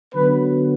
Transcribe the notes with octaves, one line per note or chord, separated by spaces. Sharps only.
D3 F#3 B3 B4